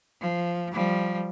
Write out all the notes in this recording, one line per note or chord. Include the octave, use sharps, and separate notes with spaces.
F3
F3 G3